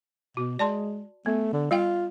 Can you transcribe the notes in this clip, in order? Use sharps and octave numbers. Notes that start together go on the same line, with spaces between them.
B2 F#4
G#3 D5 A5 C6
A3 B3
D3
G3 F4 F5 G5